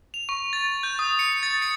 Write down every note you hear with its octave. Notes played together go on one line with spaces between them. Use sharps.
F7
C#6
A6
G6
D#6
C#7
A6
C#7